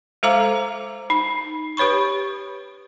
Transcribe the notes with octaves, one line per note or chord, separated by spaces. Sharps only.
G#3 A4 C5 F5 A#5 D6
D#4
G4 B4 C#5 B5 C#6